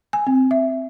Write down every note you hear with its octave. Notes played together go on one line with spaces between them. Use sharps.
G#5
C4
E5